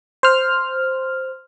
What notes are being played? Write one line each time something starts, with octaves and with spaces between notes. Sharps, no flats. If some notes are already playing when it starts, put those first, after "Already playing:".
C5 F6